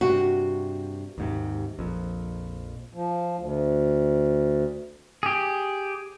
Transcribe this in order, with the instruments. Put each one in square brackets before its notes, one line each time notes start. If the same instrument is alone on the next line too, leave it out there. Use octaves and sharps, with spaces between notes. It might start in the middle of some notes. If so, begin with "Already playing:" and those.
[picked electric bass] G2 C3 [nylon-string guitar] F#4
[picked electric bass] D#2 G#2 C3
A#1 F2
[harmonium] F3
D2
[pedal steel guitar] G4 G#4